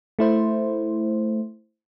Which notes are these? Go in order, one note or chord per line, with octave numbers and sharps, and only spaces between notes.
A3 E4 C5